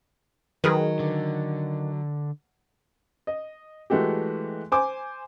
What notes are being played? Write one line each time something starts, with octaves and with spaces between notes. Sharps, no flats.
D#3 F#3 G#4 A#4 B4
D3
D#5
E3 G#3 A3 F#4 G4
C5 G#5 D6